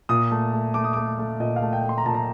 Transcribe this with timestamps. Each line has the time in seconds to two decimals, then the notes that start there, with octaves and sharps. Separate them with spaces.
0.09 A#2 D#6
0.31 A3
0.53 A3
0.74 A3 D6
0.84 D#6
0.93 A3 D6
1.19 A3
1.40 A#2 D#5
1.56 F5
1.62 A3
1.73 G5
1.83 A3
1.89 C6
1.98 A#5
2.06 A#2 A5
2.14 A#5